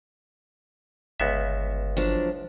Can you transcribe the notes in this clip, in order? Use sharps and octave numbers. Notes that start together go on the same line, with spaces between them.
G1 C#2 B3 E5
F3 F#3 D4